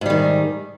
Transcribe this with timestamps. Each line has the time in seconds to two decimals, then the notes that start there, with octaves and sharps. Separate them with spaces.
0.01 G#2
0.06 G3
0.10 D#3